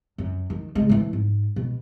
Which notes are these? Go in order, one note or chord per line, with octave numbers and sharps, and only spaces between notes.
F#2
D#3
D3 G#3
A2 E3
G#2
B2